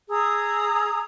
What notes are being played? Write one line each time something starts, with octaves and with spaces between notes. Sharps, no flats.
G#4 A#5 D#6 E6